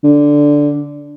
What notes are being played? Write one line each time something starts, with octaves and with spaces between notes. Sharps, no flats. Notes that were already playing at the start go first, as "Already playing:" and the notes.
D3